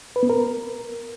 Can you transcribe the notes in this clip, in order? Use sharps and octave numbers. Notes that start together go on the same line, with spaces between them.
B4
B3
A#4